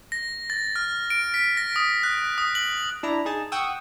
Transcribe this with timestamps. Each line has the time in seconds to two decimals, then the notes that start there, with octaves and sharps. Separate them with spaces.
0.12 A#6
0.50 A6
0.76 F6
1.10 D7
1.34 B6
1.57 A#6
1.76 D#6
2.03 F#6
2.38 D#6
2.55 F#7
3.03 D4 E4 A#5
3.25 D#4 G#4 A5
3.52 F#5 G5 C#6 D#6 E6